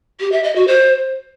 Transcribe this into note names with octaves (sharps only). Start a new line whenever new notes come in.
G4
E5
D#5
F#4
C5